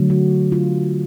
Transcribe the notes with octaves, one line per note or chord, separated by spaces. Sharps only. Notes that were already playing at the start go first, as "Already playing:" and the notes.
Already playing: D3 F#3 A3
F#4
F4